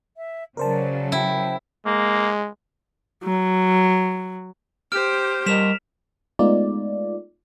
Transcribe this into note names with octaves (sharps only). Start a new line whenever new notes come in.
E5
C#3 F#3 A#4 C5 D5 A5
E4 G5
G#3 A#3
F#3
G4 C5 F6 D7
G3 A#4 D#5 B6 E7 F7
G#3 A3 B3 D#4 F4 D5